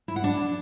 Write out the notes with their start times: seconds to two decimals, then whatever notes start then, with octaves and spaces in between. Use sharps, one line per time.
0.08 E4
0.16 F#5
0.24 D4